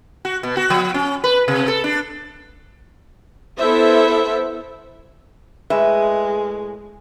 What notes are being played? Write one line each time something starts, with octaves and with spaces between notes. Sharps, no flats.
F#4
B2
F#4
F3
C#4
B4
C3
A4
D4
B3 E4 A4 C5 E5
A2 G#3 B4 E5